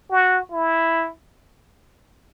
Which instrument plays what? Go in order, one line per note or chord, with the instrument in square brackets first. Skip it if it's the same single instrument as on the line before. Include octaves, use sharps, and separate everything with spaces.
[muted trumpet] F#4
E4